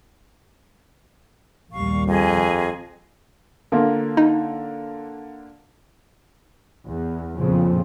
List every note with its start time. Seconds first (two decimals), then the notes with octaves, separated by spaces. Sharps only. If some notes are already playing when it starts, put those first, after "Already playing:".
1.72 A#1 D#2 G3 F5 C#6
2.07 F2 G#4 D#5 G#5
3.72 D3 A#3 F4
4.17 D#4
6.87 E2
7.36 A#1 F2 A#2 C#3 F3